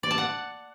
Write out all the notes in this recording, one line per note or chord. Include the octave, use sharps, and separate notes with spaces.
D5
A5
F#5